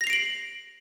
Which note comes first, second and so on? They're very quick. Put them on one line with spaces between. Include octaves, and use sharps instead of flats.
A#6 F7 C7 D7 F#7